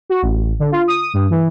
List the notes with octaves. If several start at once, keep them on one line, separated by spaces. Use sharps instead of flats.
F#4
A1
D3
F4
D#6
G2
E3